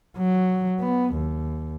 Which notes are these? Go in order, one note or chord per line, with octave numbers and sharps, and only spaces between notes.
F#3
B3
D#2